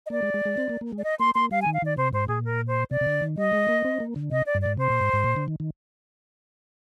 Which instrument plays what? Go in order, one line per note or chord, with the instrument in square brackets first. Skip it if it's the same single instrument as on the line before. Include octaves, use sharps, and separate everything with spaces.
[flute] D#5
[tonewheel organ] A#3 [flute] D5
[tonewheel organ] G#3
G#3
G#3
C4
A#3
A#3
G#3
[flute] D5
D#5
[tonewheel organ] A#3 [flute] C6
[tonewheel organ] A#3 [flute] C6
[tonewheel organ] G3 [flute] F5
[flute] G#5
[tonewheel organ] D#3
[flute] F5
[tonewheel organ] D#3 [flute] D5
[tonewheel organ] C3 [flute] C5
[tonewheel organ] G#2 [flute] C5
[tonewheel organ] A#2 [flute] G#4
[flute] A#4
C5
[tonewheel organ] C3 [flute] D5
[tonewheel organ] C3
D3
D#3
[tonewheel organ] G3 [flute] D#5
[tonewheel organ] G#3
A#3
C4
A#3
D3
[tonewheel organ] C3 [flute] D#5
[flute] D5
[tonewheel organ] G2
[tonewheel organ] G#2 [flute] D5
[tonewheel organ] C3 [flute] C5
[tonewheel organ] A#2
G#2
G#2
A#2
D3
D#3
D#3